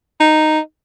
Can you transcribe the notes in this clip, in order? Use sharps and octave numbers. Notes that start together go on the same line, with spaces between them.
D#4